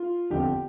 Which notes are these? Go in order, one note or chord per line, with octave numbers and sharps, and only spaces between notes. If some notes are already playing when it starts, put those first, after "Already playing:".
Already playing: F4
G1 F2 D3 F3 G4